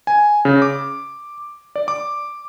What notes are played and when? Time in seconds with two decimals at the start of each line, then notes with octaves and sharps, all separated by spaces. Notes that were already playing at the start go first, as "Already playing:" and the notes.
0.07 G#5
0.45 C#3
0.62 D6
1.76 D5
1.88 D6